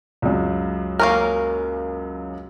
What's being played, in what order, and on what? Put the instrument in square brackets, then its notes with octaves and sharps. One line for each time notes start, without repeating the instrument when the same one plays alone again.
[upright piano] C#2 F#2
[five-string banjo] A#3 C#4 A#4